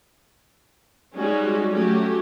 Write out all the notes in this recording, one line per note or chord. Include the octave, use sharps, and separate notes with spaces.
G3 G#3 C#4 D#4 F#4
F#3 A3 C#4 F#4 G4